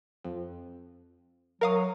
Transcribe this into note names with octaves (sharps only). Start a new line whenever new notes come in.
F2
F#3 A#4 F5 D#6